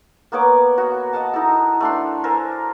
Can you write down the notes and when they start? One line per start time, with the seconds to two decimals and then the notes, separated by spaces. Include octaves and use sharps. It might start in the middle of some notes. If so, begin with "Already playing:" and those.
0.32 A#3 B3 C#5 D6
0.78 F#4
1.13 D#5 F#5 A5
1.34 D#4 E4 A4
1.80 A3 D4 C6
2.24 A4 A#4 C5 G#5